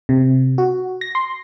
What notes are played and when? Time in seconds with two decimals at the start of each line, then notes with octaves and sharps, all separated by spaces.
0.09 C3
0.58 F#4
1.01 A#6
1.15 C6